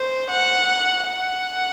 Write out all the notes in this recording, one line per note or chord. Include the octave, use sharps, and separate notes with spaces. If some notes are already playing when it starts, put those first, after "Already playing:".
Already playing: C5
F#5
F#5